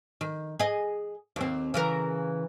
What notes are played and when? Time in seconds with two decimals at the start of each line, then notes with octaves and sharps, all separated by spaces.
0.21 D#3
0.59 G#4 D#5
1.36 D#2 C4
1.74 C#3 E3 A#4